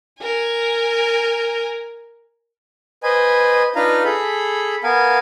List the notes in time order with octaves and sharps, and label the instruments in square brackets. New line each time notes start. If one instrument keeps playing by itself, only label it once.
[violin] A#4 G#5
[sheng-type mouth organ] B4 C5 D#5 G#5
D4 D#4 F4 B4 F5 A#5
G#4 A4 B5
B3 A#4 F5 G#5